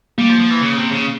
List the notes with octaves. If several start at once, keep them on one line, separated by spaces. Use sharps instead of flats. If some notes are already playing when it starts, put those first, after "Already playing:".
G3 A#3
F3
F3
E3
C#3
C3
C#3